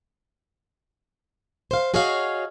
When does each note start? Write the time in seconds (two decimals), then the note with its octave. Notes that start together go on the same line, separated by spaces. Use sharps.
1.71 C5 F5
1.94 F#4 G#4 C#5 D#5 F5